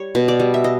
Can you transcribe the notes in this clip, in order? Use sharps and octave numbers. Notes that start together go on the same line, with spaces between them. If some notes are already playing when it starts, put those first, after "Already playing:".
Already playing: G3 C#5
B2
D5
G3
E5
D#5